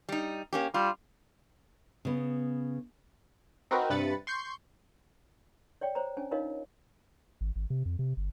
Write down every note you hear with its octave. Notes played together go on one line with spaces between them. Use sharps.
G3 D#4
A#3 C#4 G4
G3 F4
C#3 B3
C4 D#4 F#4 A#4 B4
G2 C3 B4 B5 A6 C#7
C6 C#6 G6 C7
C#5 D5 G5
C5 C#5 A#5
C#4 D4 G#5
D#4 F4 A#4 C#5 D#5 F5
G#1
G#1
C3
F2
C3
G1